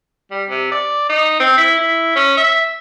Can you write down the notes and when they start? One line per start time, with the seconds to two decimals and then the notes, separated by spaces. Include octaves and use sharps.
0.31 G3
0.49 C3
0.71 D5
1.09 D#4
1.40 C4
1.57 E4
1.78 E4
2.16 C#4
2.37 E5